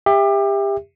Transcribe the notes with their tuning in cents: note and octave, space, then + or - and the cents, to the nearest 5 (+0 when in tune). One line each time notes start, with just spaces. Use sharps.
G4 +30 E5 +0